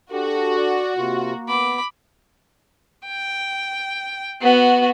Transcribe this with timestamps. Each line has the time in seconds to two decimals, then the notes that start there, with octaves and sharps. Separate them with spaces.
0.12 D4 F#4 G4 A4
0.57 D5
0.97 C3 A#3 F4
1.49 B3 B5 D6
3.08 G5
4.42 B3 F#4